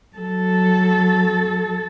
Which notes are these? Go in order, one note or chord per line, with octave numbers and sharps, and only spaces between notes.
F#3 A4